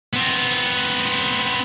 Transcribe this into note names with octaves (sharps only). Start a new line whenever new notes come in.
B3 C4